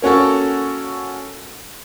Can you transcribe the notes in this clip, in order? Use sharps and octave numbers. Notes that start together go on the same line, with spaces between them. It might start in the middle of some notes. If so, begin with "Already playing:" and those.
A#3 C#4 F#4 A4